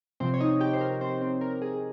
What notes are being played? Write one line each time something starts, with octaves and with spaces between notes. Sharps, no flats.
C3 F3 C4 C5
C#5
D#4 D#5
G4 G5
C5
A#4
C4 C5
C4 C5
A#4
G#4